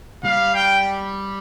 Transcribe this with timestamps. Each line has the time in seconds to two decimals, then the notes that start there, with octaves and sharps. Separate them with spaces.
0.24 G3 F5
0.54 G5